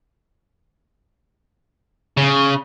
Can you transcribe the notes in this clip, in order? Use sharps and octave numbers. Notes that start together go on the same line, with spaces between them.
C#3